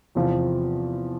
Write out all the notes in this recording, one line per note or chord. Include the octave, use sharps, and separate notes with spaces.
E2 C3 F3